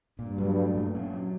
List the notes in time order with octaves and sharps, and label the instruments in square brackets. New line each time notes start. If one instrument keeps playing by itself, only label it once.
[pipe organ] G2 [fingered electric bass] A#2
[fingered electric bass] F#3
A3
A#2
C#4
F#3